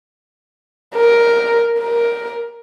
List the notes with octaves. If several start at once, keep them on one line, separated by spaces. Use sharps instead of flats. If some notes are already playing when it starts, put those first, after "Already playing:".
A#4
A#4